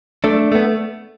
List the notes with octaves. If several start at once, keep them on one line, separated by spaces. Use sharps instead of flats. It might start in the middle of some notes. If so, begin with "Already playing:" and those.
A3 D4
A3 B3